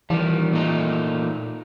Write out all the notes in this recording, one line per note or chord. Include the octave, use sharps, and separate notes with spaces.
D#3 E3 G3
A#2 A3 D#4